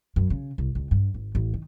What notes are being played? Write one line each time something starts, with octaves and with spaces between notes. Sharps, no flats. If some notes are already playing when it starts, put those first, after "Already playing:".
F#2
C#3
C2
C#2
G2
G#1
A1
D#3